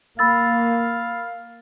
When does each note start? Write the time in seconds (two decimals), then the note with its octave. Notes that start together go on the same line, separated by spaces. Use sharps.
0.19 A#3 F5 B5 E6 A6